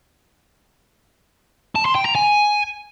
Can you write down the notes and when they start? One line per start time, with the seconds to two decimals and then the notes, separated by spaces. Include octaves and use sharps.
1.75 A5
1.85 C6
1.95 G5
2.05 A#5
2.15 G#5